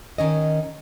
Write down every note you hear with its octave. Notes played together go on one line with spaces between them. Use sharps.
D#3 C#4 D#5